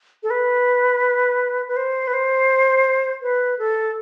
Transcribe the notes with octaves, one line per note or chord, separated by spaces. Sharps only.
A4
B4
B4
C5
B4
C5
B4
A4